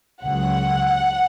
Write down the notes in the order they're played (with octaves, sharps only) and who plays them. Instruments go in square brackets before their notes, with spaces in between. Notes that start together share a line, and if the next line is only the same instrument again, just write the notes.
[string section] C#2 C#3 F#3 F#5